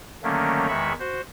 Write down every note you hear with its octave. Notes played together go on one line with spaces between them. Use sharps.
D3 D#3 F#3 A3 A#3 C#4
E2 D#3 G#3 E5 B5 C#6
F#4 C5